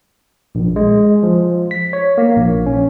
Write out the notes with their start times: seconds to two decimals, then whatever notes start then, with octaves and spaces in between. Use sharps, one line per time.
0.55 A#1
0.76 G#3
1.23 F3
1.71 B6
1.93 C#5
2.18 A#3
2.37 A#1
2.66 C#4